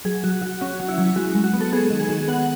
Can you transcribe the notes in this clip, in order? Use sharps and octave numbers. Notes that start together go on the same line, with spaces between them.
F#3 G#4
F#3 F#4
F#3 F#4
C#4 F#4
F#3
E4
F#3
G#3 F#4
G#3
F#4
B3
A4
B3 G#4
D#3
G#4
D#3
B3 F#5